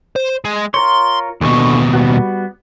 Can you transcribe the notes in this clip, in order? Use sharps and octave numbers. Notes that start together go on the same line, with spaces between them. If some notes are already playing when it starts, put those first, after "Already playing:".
C5
G#3
F4 A#4 C#5 C6
D#2 B2 D3 G#5 C#6
G3 B3 F#4